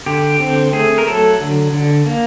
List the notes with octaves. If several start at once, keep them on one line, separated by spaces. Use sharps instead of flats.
D3 G4
C4
A3 G#4
A#4
F#3 A4
D3
D3
A#3